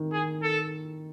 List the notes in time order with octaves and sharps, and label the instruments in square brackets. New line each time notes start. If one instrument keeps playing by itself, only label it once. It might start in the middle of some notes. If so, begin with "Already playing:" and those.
Already playing: [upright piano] D#3
[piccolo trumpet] G#4
A4